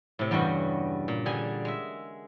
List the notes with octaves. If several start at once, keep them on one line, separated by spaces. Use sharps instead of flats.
A2 C3
E2 G2 C#3 G3 F#4 F#5
A#2
D3 G3 G#4 G#5
G#3 E5